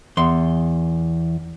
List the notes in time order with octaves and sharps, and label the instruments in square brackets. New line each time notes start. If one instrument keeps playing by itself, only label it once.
[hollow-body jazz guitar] E2 C6